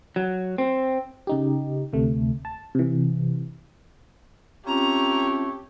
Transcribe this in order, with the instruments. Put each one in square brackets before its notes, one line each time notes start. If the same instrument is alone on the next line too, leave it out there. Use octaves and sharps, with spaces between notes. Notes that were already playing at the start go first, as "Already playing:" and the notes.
[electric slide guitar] F#3
C4
[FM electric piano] C#3 D#4 G4
D2 C3 A3
A5
C3 E3
[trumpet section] A3 C#5 [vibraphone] C4 C#4 F4 [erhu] G4 [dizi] A#5